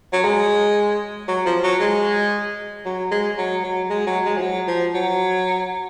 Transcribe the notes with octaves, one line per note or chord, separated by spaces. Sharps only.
F#3
G#3
F#3
F3
F#3
G#3
F#3
G#3
F#3
F#3
G#3
F#3
G#3
F3
F#3
F3
F#3